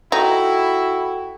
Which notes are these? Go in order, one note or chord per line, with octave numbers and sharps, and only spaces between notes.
D#4 E4 F#4 A4 G5